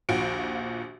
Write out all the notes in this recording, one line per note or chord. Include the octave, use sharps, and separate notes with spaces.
A#1 D#2 F3 F#4 D7